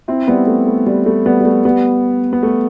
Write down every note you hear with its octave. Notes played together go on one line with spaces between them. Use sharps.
C4 E4
G3 B3
A3
A3
G3
A3
G3 B3
G3
A3
G3 B3
B3
A3